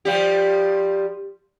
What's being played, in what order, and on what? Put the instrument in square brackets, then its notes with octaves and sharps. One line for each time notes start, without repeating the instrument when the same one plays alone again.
[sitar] F3 G3 G4